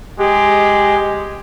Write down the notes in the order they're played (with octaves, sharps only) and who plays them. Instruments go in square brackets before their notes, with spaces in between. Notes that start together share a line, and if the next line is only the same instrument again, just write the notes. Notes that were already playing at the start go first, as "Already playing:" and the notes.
[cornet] G#3 [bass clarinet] G4